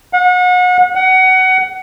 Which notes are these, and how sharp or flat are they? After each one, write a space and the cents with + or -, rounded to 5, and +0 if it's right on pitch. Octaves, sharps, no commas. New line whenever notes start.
F#5 -35
F#5 +20